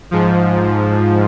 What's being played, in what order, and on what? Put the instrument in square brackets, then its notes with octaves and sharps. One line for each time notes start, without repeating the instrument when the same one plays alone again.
[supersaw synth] G#2 F3